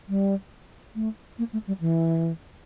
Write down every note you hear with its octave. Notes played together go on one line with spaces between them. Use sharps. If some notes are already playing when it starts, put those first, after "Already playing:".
G3
A3
A#3
A3
G3
E3